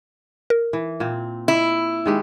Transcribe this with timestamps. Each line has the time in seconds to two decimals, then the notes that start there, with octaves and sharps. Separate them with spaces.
0.50 A#4
0.73 E3
1.00 A#2 C4
1.48 E4
2.06 D#3 G#3 G4